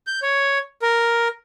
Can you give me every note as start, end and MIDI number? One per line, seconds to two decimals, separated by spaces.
0.07 0.20 91
0.22 0.58 73
0.82 1.28 70